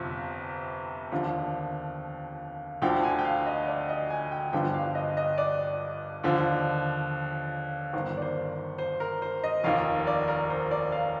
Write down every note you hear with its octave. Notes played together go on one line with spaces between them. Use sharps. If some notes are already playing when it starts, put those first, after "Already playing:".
Already playing: G1 F2 C3 F3
D#2 D3 F3
D2 D3 F3 G5
G#5
G5
F5
D#5
D5
D#5
G#5
G5
G1 G2 D3 F3 G5
F5
D#5
D#5
D5
D#2 D3 F3
G1 G2 D#3 C5
D5
C5
C5
A#4
C5
D#5
F1 D#2 D#3 F5
D5
A#4
C5
D5
F5